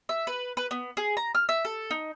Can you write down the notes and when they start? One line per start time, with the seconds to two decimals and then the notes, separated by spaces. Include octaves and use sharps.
0.09 E5
0.27 B4
0.57 B4
0.71 B3
0.97 G#4
1.17 A#5
1.35 F6
1.49 E5
1.65 A4
1.91 D#4